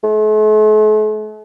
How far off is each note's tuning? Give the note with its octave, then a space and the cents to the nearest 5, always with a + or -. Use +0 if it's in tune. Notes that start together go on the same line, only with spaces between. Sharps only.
A3 -45